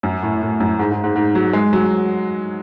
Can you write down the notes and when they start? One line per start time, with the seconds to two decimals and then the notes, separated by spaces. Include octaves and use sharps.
0.03 F#2
0.23 A2
0.42 A2
0.60 F#2
0.79 G#2
0.92 G#2
1.04 G#2
1.16 G#2
1.35 F#3
1.53 G#3
1.73 F#3